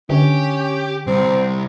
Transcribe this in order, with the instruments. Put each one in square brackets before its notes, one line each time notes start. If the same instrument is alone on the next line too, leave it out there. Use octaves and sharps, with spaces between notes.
[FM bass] D3 [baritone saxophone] C#4 [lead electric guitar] G4
[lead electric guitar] C2 [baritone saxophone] C4